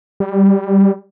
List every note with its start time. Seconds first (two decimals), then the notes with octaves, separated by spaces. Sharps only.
0.20 G3